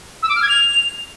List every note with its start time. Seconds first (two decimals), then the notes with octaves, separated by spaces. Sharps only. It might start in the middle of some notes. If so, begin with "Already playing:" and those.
0.23 E6
0.29 D6
0.36 F6
0.42 G#6
0.49 F7